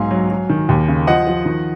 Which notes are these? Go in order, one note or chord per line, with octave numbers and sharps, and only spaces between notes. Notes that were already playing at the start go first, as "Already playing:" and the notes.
Already playing: B1 G#2 F5 G#5
F#3
F#3
D#3
D#2
C#3
F3 D#5 F#5
F3
D#3